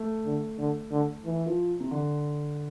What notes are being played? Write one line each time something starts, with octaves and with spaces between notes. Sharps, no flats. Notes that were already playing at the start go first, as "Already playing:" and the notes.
Already playing: A3
D3
D3
D3
E3
F3
C3
D3